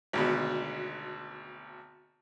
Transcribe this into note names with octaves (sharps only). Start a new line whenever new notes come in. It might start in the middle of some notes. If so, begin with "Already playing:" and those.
G#1 D2 B2